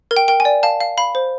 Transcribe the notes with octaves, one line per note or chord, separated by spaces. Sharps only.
A#4
G5
A#4 G5
G#5
D5
F5 A5
F5
F5 B5
C5